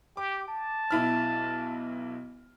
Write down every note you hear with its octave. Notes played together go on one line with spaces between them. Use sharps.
G4 D6
A5
B1 E4 F6